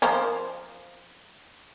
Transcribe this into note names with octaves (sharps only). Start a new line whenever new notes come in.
F3 A#4 C5